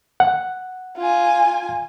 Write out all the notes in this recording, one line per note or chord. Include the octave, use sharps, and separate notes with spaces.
F#5
F4 G#5